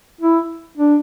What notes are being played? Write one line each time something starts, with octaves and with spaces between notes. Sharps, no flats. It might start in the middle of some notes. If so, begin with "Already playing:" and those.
E4
D4